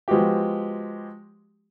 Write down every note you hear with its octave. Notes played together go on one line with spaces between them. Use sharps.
F3 G#3 B3 F#4 G4